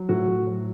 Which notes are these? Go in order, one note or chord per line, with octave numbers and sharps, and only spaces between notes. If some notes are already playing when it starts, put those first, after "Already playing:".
Already playing: F#3
A2 F#4
A2
F#3